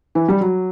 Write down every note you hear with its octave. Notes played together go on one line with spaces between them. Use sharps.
E3
G3
F#3